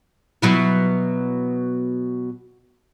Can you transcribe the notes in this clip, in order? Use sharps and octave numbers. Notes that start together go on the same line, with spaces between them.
B2 F#3 E4